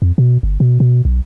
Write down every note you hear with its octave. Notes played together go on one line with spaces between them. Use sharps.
F2
B2
G1
B2
B2
B1